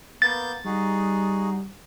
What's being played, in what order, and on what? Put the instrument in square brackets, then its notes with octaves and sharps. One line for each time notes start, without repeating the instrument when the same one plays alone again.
[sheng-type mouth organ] A#3 B3 G6 [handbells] A6
[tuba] G3 [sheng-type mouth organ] D#4 F#4 G#4